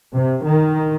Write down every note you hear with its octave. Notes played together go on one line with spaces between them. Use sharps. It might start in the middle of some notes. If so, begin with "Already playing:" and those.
C3
D#3